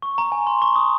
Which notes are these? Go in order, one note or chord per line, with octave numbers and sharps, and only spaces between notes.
C#6
A#5
G#5
C6
C#6
D#6